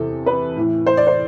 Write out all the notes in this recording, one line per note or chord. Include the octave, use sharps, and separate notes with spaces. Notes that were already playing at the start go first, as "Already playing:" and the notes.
Already playing: E2 C3 A4
B4
A2 E3
C5
D5
C5